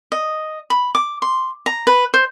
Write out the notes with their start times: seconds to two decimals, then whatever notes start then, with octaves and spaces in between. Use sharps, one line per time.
0.12 D#5
0.70 B5
0.95 D6
1.22 C6
1.66 A#5
1.87 B4
2.14 C5